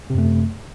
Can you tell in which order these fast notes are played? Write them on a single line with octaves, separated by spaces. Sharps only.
C3 F#2 A3